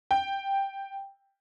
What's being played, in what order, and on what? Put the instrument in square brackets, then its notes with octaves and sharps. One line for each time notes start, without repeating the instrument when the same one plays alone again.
[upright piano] G5